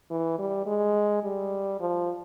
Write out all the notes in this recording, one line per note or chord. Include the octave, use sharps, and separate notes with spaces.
E3
G3
G#3
G3
F3